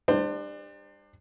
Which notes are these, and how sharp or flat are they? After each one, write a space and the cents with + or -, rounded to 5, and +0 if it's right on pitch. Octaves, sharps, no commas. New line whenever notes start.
G3 +30 D4 +30 C5 +0